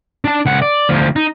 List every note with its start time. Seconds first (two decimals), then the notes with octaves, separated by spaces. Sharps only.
0.25 D4 A5
0.46 C#2 F#5
0.62 D5
0.89 D2 F3
1.16 D#4